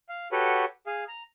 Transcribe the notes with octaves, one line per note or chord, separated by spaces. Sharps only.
F5
F#4 G4 A4 B4 C#5 F#5
G#4 F5
A#5